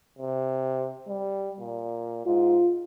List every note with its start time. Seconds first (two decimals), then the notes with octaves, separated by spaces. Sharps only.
0.19 C3
1.08 G3
1.60 A#2
2.26 G#2 F4